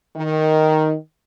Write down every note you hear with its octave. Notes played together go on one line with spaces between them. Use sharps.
D#3